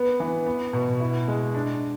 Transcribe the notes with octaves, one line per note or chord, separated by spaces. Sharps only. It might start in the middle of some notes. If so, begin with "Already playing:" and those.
Already playing: B3
E3
B3
B2
E4
G#3
D4